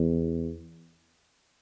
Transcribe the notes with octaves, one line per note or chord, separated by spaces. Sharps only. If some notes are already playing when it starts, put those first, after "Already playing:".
Already playing: E2